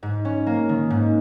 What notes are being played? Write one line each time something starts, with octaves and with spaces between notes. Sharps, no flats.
G#2
C#4
A#3
D#3
G#2